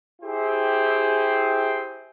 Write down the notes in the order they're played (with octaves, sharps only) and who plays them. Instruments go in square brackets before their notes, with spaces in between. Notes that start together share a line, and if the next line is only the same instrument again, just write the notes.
[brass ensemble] E4 G4 G#4 C5 G5